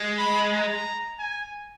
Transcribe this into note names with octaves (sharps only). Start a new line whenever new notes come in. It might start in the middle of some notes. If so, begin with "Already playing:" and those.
Already playing: G#3
B5
A#5
G#5